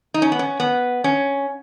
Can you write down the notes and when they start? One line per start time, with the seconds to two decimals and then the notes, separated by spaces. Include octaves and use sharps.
0.14 D#4
0.22 C#4
0.32 B3
0.39 C#4
0.60 B3
1.04 C#4